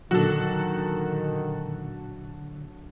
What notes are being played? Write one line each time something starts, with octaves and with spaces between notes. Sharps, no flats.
A#2 D3 D#3 F#3 D4 F#4 A4